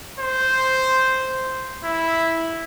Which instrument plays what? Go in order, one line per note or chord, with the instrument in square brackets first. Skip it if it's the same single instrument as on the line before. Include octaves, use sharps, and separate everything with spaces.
[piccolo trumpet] C5
E4